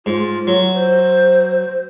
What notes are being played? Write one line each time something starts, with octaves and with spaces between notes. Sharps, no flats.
G#2 F4
F#3
C5